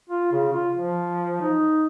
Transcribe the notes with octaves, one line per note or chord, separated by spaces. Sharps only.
F4
C#3
F4
F3
D#4